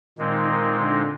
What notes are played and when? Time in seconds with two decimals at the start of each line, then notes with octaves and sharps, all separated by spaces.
0.17 A#2 D#3 G#3 C4 D#4
0.47 D#3
0.78 D3